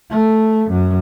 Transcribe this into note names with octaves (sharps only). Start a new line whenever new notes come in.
A3
F#2